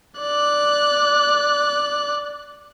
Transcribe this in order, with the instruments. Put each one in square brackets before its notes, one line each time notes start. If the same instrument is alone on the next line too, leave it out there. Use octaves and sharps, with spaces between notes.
[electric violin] D5 F#6